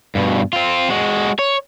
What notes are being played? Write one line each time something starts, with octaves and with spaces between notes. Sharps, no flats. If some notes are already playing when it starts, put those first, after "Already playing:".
G2 B2
C4 F4
G#3 F#4
C#5